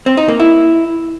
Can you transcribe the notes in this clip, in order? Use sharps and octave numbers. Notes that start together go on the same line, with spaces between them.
C4
D#4
A#3
E4